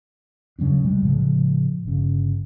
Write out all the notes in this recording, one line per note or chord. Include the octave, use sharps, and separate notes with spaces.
C#3 F#3 C#4 D4
C3 G3 G#3
A2 C#3 F3 G#3
G1 C#3